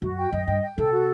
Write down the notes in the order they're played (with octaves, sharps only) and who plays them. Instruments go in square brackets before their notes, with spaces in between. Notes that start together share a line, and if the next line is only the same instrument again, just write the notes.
[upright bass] F#2 [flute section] F#4
[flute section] G5
[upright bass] F#2 [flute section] D#5
[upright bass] G2 [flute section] G5
[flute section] G5
[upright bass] C3 [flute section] A4
[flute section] F#4